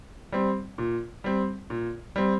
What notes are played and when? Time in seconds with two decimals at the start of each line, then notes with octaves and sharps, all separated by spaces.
0.32 G3 C4
0.78 A#2
1.24 G3 C4
1.70 A#2
2.16 G3 C4